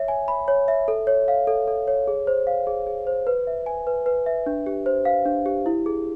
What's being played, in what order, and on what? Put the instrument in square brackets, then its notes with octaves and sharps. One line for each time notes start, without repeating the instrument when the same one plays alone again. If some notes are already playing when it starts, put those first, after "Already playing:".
Already playing: [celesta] C#5 E5
G#5
B5
C#5
E5
A4
C#5
F5
A4
A4
C#5
G#4
C5
F5
G#4
G#4
C5
B4
E5
G#5
B4
B4
E5
D4
G4
C5
F5
D4
G4
E4
G#4